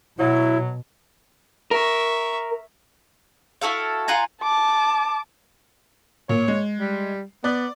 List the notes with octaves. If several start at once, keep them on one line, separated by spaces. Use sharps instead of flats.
B2 F#3 E4
A#4 E5 C#6
E4 F#4 A4 F5
F4 F#5 G#5 A#5
A5 D6
A#2 C#5
G#3
G3
B3 D5